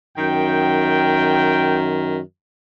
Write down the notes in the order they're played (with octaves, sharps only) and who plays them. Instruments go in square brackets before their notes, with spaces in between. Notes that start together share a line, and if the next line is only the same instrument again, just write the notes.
[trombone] F#2 [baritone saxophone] D#3 [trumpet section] G5